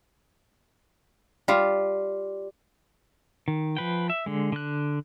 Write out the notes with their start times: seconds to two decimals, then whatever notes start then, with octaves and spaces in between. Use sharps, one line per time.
1.48 G3 F4
3.48 D#3
3.77 F3 B4 G5
4.10 E5
4.26 D3 G#3
4.52 D3 F#6